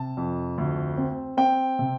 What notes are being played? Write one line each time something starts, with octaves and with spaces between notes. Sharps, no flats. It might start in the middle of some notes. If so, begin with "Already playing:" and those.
Already playing: C3 A5
F2
D2
C4
C4 G5
C3